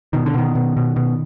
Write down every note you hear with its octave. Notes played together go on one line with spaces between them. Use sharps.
B2 D#3
D3
B2 D#3
B2
B2
B2